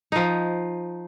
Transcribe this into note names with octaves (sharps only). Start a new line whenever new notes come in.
F3 D#4